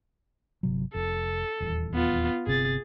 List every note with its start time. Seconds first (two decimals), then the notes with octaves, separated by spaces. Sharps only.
0.63 G1 C3 F#3
0.94 F1 A4
1.60 D#1 E2
1.94 B3 F4
2.47 G1 C3 C4 G#4 A6